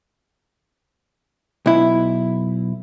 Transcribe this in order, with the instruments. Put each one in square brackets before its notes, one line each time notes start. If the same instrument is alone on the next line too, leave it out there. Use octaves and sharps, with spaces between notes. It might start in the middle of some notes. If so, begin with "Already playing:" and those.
[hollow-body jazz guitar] B1 E4